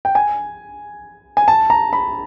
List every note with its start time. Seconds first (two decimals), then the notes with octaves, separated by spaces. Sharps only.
0.05 G5
0.15 G#5
1.37 G#5
1.48 A5
1.70 A#5
1.93 B5